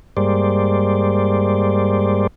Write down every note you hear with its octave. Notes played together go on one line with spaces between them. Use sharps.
G2 G3 G#3 A#3 C5 D5